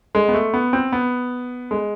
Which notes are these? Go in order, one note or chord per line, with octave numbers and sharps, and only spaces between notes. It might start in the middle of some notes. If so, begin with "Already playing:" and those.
G#3
B3
A3
B3
C4
B3
G#3